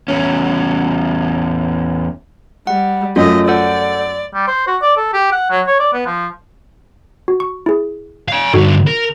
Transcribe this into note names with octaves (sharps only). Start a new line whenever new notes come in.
E2 C#4
G3 F#5
F#2 A3 F4 D#5
A4 C5 D5 F#5
G3
C5
F#4
D5
A4
G4
F#5
F#3
C#5
D5
B3
F3
F#4
C#6
E4 G#4
F5 G#5
G2 D3 D#4 F#4 A4
A#4